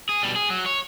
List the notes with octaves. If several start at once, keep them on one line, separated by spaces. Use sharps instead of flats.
G#4
B2 G3
G#4
F#3
C#5